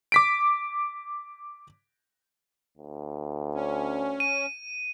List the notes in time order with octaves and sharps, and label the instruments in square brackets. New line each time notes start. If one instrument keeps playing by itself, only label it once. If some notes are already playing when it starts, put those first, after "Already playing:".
[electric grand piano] D6 B6 D7
[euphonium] D2
[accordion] C#4
[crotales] D#7